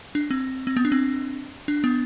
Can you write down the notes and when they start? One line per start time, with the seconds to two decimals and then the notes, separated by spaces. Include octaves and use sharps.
0.15 D4
0.31 C4
0.67 C4
0.77 B3
0.85 D4
0.92 C4
1.68 D4
1.84 B3